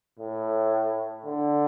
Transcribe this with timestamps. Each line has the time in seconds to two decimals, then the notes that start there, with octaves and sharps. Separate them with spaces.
0.19 A2
1.26 D3